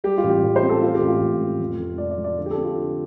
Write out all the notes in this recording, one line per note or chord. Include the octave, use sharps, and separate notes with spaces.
G3 G4
F4
A1
G4
A1
C5
C4
A4
A3 F4
G4
A1
F4
A1
A2
F1
F1
F3 D5
D5
F3
D5
D3
G4
A4
C4
F4
D3